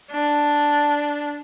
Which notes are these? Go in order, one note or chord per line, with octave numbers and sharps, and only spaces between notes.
D4